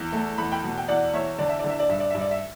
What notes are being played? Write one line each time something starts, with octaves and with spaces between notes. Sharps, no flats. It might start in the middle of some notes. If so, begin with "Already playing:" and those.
Already playing: E2
A3
E2 B5
G5 B5
B2
G5
E2 D5 F#5
E2 C#5 E5
D3 D5
E5
D3 D5
E5
D5
G2 E5
D5
G2 E5
D5
E5